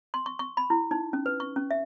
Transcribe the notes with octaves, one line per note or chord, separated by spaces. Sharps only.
C6
C#6
C#6
B5
E4
D#4
C#4
B4
C#6
C#4
E5